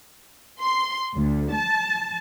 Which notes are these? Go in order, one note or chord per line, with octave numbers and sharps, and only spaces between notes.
C6
D2
A5